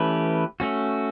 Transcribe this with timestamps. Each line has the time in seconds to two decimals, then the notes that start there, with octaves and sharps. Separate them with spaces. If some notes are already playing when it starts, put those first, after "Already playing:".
Already playing: E3 A3 C#4 G4 B4
0.60 A3 C#4 F#4